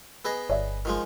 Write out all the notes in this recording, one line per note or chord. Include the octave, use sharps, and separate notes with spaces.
B3 G#4 D#5
G1 C#5 D5 E5
D#3 F3 G#3